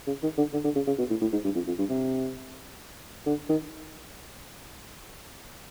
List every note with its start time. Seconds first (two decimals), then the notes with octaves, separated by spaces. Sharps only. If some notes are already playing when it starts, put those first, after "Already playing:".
0.07 C#3
0.23 D#3
0.37 D3
0.53 D3
0.64 D3
0.75 C#3
0.87 C#3
0.98 B2
1.10 A2
1.21 A2
1.32 G#2
1.44 G2
1.55 F2
1.67 F2
1.78 G2
1.89 C3
3.26 D3
3.49 D#3